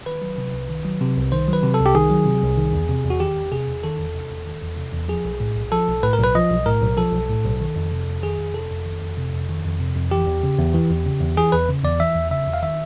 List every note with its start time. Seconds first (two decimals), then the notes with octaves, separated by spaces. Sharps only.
0.06 D#3 B4
0.22 F#3
0.38 C3
0.53 C2
0.69 D#3
0.85 F#3
1.01 C3
1.17 C2
1.32 D#3 C5
1.48 F#3
1.53 B4
1.63 C3
1.74 A4
1.79 C2
1.86 G4
1.95 D#3 G#4
2.10 F#3
2.26 C3
2.43 C2
2.57 D#3
2.73 E2
2.89 C3
3.04 E2
3.10 F#4
3.20 D#3 G4
3.36 E2
3.52 C3 G#4
3.68 E2
3.84 D#3 A4
3.99 E2
4.14 C3
4.30 E2
4.46 D#3
4.62 E2
4.77 C3
4.93 E2
5.08 F3 G#4
5.25 B1
5.40 A2
5.56 B1
5.72 F3 A4
5.87 B1
6.03 A2 B4
6.13 A#4
6.19 B1 B4
6.35 F3 D#5
6.51 B1
6.66 A2 A#4
6.82 B1
6.97 F3 A4
7.13 B1
7.29 A2
7.44 B1
7.61 D#3
7.76 F2
7.92 C3
8.07 F2
8.23 D#3 G#4
8.39 F2
8.54 C3 A4
8.71 F2
8.85 D#3
9.02 F2
9.17 C3
9.33 F2
9.49 D#3
9.65 F2
9.80 C3
9.95 F2
10.11 E3 G4
10.27 E2
10.43 C#3
10.59 E2
10.74 E3
10.90 E2
11.06 C#3
11.21 E2
11.37 E3 G#4
11.52 E2 B4
11.69 C#3
11.84 E2 D5
12.00 E3 E5
12.15 E2
12.31 C#3 E5
12.47 E2
12.53 F5
12.63 D#3 E5